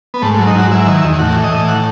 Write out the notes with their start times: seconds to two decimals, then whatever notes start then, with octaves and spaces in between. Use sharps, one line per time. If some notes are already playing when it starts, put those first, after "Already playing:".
0.14 B3
0.22 G#2 A3
0.34 A3
0.38 F#3
0.47 D#4
0.55 G#2 F#4
0.71 F#3 E4
0.87 D#3
1.03 E2
1.19 A2 F#4
1.36 E3
1.44 D#5
1.52 A2
1.68 F#5